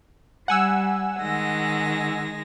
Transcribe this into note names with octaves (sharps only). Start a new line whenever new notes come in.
G3 F#5 G#5 E6
D#3 G#3 A#6